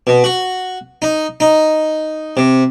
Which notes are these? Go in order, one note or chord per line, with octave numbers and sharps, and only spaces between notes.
B2
F#4
D#4
D#4
C3